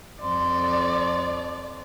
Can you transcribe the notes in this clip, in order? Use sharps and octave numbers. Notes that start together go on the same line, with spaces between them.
F2 D5 C6